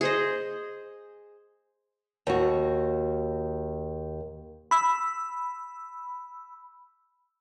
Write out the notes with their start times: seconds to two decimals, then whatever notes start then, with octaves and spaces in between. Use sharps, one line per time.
0.01 G#4 C5 D#5
2.27 D#2 F#4
4.71 B5 E6